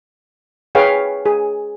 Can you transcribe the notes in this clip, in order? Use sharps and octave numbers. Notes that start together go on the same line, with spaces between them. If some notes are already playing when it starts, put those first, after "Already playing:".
G#4 B4 C#5 F5 G5
G#4